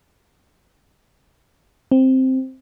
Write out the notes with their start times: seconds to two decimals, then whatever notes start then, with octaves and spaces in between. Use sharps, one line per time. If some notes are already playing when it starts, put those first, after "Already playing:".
1.92 C4